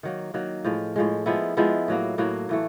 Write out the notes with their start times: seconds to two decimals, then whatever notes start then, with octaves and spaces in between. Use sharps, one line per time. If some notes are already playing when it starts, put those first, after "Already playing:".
0.03 D#3 F#3 A#3
0.34 D#3 F#3 A#3
0.65 A2 F3 G#3
0.96 A2 F3 G#3
1.26 F3 G#3 B3 E4
1.57 F3 G#3 B3 E4
1.88 A2 F#3 A#3
2.18 A2 F#3 A#3
2.49 A2 E3 A3